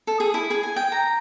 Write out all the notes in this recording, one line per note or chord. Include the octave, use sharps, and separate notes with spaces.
A4
G#4
E4
G#4
G#5
G5
A#5